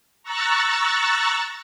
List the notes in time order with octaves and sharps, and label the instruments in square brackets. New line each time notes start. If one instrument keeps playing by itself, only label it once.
[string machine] A#5 C#6 E6 F#6 A6